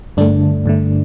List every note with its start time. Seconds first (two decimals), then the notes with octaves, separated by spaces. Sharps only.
0.17 G2 D3 A3 D4
0.66 G2 D3 A3